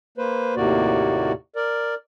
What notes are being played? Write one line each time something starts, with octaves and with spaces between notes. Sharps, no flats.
A#3 B4 C5
D#2 A2 C3 A#3 F#4 D5
A#4 D5